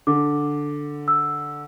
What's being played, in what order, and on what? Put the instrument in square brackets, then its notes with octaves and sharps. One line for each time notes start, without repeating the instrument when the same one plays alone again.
[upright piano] D3 [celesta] D6
[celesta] E6